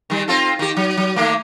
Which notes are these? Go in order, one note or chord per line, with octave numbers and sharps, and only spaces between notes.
D#3 G3
C4 F4 A4
D#3 G4
F#3
F#3
D#3 A3 A#3